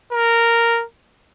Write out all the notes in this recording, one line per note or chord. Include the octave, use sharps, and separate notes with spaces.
A#4